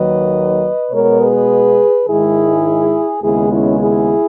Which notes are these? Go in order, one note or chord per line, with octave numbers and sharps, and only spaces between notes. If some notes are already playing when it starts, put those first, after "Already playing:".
Already playing: D#2 D#3 F#3 A#3 B4 D#5
B2 G#3 B3 A#4 C#5
G#4 B4
G#2 D#3 G#3 E4 G#4
D#2 C#3 G#3 B3 E4 G#4
C#4 E4
E4 G#4